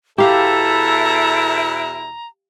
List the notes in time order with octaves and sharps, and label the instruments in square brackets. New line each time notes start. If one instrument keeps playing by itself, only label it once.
[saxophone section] E2 B2 E4 [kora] G4 F5 [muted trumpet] A4 [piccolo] A#5